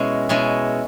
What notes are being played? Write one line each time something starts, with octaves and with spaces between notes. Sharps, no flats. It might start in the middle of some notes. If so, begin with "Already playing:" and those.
Already playing: B2 G#3 C#4 E4
B2 G#3 C#4 E4